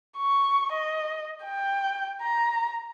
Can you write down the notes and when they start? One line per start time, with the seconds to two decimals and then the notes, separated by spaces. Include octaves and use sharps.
0.17 C#6
0.73 D#5
1.45 G5
2.22 A#5